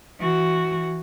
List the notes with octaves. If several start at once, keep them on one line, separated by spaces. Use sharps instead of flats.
E3 F#4